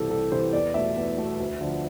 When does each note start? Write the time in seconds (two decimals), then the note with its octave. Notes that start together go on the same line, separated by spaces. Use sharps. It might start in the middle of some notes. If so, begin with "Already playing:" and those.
Already playing: C2 C3 E3 G3 G4 A4
0.10 C2 A4
0.32 C3 E3 G3 C5
0.53 E2 D5
0.74 B2 A3 E5
0.96 E2
1.18 B2 A3
1.40 D2
1.61 D3 F3